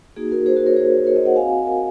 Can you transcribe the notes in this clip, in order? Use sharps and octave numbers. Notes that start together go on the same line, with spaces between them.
A#3 D#4 F#4 G#4
F#4 A#4
G#4 C5
F#4 A#4
A#4 C#5
G#4 C5
A#4 C#5
C5 D#5
D#5 F#5
C4 F#4 F5 G#5
F#4 A#4